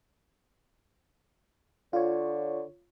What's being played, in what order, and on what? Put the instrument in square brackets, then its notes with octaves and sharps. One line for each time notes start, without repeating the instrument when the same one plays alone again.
[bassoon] D3 [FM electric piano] F4 C#5